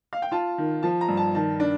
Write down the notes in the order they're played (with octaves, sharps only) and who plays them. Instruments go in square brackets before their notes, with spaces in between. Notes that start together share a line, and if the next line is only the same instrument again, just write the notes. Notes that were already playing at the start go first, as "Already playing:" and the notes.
[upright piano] F5
G5
F4 A5
D#3
F3 A5
A#5
G2
A5
D#3 A5
D4